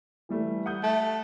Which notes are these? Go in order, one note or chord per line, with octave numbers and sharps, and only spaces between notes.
E3 G3 A3
F#5 D#6 G6
A3